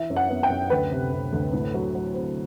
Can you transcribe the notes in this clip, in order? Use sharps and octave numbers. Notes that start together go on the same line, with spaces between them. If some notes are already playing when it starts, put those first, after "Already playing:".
Already playing: E3 E5
F#2
F#5
B3
G5
F#2
D2 B4
C3
C3
D2
A2
F#3
F#3
C4